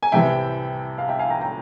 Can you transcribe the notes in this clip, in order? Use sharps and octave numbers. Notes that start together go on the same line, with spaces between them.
G#5
C2 C3 E3 E5 G5
F5
E5 G5
F5 G#5
G5 A#5
G5 A#5